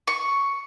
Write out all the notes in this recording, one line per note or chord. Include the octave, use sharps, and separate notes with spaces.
C#6